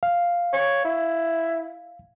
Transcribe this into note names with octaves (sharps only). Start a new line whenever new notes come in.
F5
C#5
E4